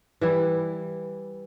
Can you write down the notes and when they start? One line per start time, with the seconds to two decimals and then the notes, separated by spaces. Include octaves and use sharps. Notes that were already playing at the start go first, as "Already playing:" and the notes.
0.21 E3 G3 E4